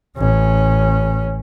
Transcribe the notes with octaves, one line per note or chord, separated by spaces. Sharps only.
A1 C#4